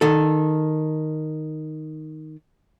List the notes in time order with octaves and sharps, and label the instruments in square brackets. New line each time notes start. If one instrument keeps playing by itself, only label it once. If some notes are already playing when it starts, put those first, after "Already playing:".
[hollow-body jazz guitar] D#3 A4